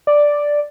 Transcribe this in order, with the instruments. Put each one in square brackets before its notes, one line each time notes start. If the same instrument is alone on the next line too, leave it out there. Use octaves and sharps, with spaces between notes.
[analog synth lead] D5